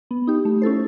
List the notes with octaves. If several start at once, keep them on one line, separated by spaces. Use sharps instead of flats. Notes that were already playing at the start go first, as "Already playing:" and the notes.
B3
D#4 G4
A3
C#4 E4 A4 C5